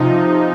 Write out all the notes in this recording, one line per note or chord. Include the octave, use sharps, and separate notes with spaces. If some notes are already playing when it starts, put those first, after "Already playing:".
Already playing: C3 F3 D#4